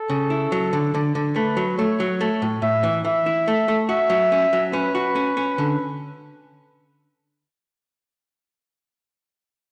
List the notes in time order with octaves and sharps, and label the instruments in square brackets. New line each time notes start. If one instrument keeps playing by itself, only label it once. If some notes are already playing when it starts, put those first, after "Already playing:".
Already playing: [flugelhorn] A4
[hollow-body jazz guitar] C#3
E4
F#3
D3
D3
D3
[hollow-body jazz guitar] A3 [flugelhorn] B4
[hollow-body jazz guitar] F#3
[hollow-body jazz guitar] A3 [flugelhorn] C#5
[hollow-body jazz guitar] F#3
A3
A2
[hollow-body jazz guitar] A2 [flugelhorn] E5
[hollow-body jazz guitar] E3
[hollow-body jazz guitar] E3 [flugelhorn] E5
[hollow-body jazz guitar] E4
A3
A3
[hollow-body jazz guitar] F#4 [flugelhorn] E5
[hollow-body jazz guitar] F#3
C#4
F#3
[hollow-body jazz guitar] C#4 [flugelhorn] B4
[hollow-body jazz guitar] F#4
C#4
C#4
D3